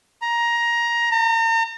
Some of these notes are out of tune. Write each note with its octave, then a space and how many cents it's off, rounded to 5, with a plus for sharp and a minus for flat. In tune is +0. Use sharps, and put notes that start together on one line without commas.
A#5 +15
A#5 -40